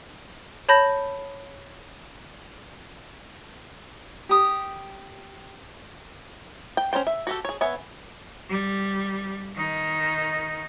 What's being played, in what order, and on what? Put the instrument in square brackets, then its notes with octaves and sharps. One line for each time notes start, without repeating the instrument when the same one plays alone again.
[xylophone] C#5 A5 B5 G6 A#6
[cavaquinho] G4 D#6
[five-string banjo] G5
C#4 D#4 C5 G5
E5
F#4 G4 A4
G#4 C#5
B3 C#5 E5 G#5
[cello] G3
D#3 D#4